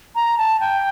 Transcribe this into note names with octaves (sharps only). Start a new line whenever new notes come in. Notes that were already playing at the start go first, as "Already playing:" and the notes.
A#5
A5
G5